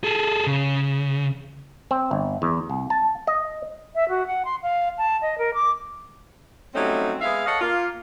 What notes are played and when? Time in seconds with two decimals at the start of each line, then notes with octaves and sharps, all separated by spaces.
0.04 G#4 A4
0.47 C#3
1.91 C4
2.11 G1
2.42 E2
2.70 C2
2.90 A5
3.27 D#5
3.95 E5
4.09 F#4
4.27 F#5
4.45 C6
4.63 F5
4.98 A5
5.22 D#5
5.38 A#4
5.54 D6
6.75 F#3 G3 A3 C4 C#4 D#4
7.21 G#3 B3 E5 F5
7.46 A4 C#5 D#5 F5 F#5
7.61 A#3 F4